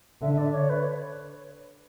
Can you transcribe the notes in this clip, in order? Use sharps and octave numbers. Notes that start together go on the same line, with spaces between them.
D3 E5
E5
D5
C#5
B4